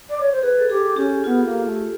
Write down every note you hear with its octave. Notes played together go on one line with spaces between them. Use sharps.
D5
C#5
C5
G#4 B4
A4
G4 G#4
C#4 G4
B3 F4
A#3
A3